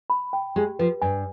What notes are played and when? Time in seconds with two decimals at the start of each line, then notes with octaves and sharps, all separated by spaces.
0.10 B5
0.33 G5
0.56 G#3 G4
0.79 F3 B4
1.02 G2 G#5